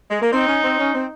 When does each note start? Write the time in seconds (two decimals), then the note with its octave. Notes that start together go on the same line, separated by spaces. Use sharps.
0.11 G#3
0.22 A#3
0.33 C4 D#4
0.48 C#4
0.64 C4
0.79 C#4
0.94 C4